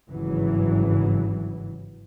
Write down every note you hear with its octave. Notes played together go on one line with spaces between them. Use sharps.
G#1 G2 C#3 E3 F#3